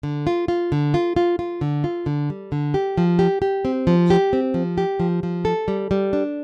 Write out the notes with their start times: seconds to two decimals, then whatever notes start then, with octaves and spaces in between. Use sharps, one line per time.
0.03 D3
0.27 F4
0.48 F4
0.72 D3
0.94 F4
1.16 F4
1.39 F4
1.61 D3
1.84 F4
2.06 D3
2.30 G3
2.52 D3
2.74 G4
2.98 F3
3.19 G4
3.42 G4
3.65 C4
3.87 F3
4.10 G4
4.33 C4
4.54 F3
4.78 G4
5.00 F3
5.23 F3
5.45 A4
5.68 G3
5.91 G3
6.13 D4